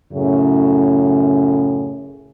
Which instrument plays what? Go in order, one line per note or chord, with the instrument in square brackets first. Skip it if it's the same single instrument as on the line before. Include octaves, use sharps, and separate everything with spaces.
[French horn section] F#2 A2 C#3